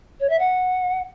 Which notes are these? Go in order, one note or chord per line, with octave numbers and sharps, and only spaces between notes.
C#5
E5
F#5